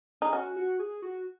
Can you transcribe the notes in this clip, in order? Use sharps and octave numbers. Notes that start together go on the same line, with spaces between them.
D#4 G#4
C#4 F#4
F#4
G#4
F#4